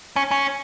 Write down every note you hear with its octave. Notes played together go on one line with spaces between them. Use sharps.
C#4
C#4